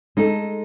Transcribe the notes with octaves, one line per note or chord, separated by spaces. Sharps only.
G#3 D#4 A4